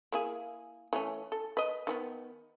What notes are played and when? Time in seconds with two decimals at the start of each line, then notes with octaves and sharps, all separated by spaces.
0.12 A#3 E4 G#4
0.93 E3 A3 C#4
1.32 A4
1.57 B4 D#5
1.87 D#3 F3 B3